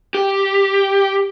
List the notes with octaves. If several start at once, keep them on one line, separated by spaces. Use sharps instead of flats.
G4